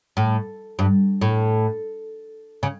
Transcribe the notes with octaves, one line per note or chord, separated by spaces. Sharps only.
A2
G2
A2
C#3